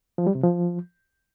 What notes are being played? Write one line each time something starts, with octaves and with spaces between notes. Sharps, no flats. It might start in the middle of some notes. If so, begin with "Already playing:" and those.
F3
G3
C3
F3